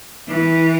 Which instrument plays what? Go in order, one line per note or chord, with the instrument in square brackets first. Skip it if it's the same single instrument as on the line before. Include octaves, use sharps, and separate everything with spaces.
[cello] E3